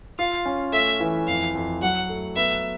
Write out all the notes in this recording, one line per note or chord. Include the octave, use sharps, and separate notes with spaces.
F4 F5
C#4
A3 E5
E3
F2 F5
F2
F#3 F#5
A3
B3 E5